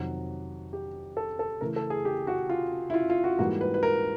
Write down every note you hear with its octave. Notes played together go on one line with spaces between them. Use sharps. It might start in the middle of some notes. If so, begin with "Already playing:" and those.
Already playing: F2 C3 D#3 F#3 F#4
G4
A4
A4
C#3 E3 A3 A#4
A4
G#4
G4
F#4
F4
E4
F4
F4
F#4
G#2 E3 G3 A#3 F#4
B4
B4
A#4